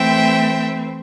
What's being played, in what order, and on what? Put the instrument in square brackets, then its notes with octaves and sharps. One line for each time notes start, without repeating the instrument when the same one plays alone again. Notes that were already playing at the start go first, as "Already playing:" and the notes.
Already playing: [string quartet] E3 A3 C4 E5 G5